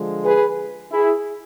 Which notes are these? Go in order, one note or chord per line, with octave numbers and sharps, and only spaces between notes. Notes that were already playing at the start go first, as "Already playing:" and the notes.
Already playing: D3 F3 G#3
G#4 B4
E4 G#4